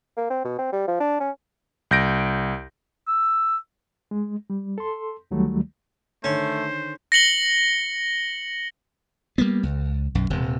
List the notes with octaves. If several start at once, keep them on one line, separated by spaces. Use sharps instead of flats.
A#3
C4
B2
C4
G3
F3
D4
C#4
C2 G6 A#6 D7
E6
G#3
G3
A4 C6
D2 D#3 F#3 G3 A3
D3 D#3 A3 C#4 C5
A#6 C#7 F#7 G7
G3 A#3 B3
C#2
B1 F#2
D#1 C3